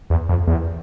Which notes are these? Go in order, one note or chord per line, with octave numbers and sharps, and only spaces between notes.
E2
F2
E2